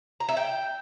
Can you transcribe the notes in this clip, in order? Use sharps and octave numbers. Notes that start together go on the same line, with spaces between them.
A#5
E5
G5